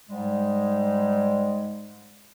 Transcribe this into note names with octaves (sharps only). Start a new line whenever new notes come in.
G#2 G3 G#3